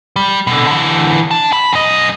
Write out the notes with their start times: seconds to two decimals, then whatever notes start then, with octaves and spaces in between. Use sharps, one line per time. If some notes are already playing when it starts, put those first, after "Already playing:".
0.16 G3
0.47 B2 D3
0.67 D3 E3
1.31 D4 A5
1.53 B5
1.73 F#2 D#5